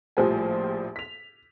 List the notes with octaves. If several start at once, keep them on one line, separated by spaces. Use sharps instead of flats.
A#1 A2 F3 G3 C5 G#5
B6 F7